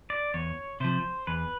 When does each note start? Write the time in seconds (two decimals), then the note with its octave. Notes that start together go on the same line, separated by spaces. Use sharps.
0.10 D5
0.34 E2 C#5
0.80 C3 F3 C5
1.27 E2 B4